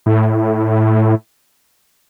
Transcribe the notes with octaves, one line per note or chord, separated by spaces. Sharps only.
A2